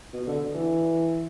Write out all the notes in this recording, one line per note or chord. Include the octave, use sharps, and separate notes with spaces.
B2
D3
E3